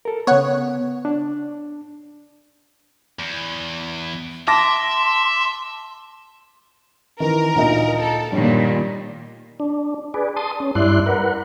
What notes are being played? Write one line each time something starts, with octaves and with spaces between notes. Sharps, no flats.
A4 A#4
C#3 B3 C#5 F#5
D4
E2
E5 A5 C6 D6 A#6
D#3 E3 A#4
D2 A#2 D#4
A4
G1 A#2 D#3 G3
D4
G#4 B4 D5
A5 C6 D#6
C#4
G2 E4 D5 C6 F#6
A#4 B4 F#5